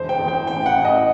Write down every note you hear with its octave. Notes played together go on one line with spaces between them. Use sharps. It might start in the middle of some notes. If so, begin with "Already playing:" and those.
Already playing: E1 C5
G5
E2
G5
A1 G5
F#5
A1
D#5